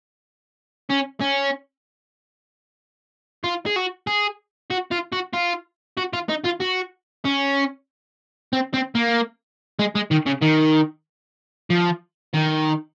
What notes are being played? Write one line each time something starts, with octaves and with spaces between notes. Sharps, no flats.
C#4
C#4
F4
G#4
F#4
G#4
F#4
F4
F#4
F4
F#4
F4
D#4
F4
F#4
C#4
C4
C4
A#3
G#3
G#3
D#3
C#3
D#3
F3
D#3